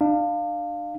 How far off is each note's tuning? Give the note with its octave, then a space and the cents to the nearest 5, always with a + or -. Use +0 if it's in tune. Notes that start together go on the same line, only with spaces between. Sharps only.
D4 +35 F5 +0